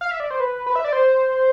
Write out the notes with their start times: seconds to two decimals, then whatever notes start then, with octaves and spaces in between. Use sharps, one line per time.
0.01 F5
0.11 E5
0.20 D5
0.31 C5
0.40 B4
0.66 B4
0.76 E5
0.84 D5
0.93 C5